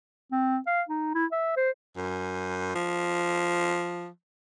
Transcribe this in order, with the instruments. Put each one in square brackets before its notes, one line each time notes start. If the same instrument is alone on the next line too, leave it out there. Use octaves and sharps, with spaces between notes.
[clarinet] C4
F5
D#4
E4
E5
C5
[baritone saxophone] F#2
F3